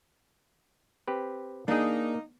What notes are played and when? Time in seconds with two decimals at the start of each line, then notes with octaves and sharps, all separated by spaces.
1.08 C4 G4 B4
1.68 A#3 D4 D#4 G#4